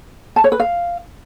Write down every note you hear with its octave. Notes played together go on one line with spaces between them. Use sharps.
A5
C#5
B4
F5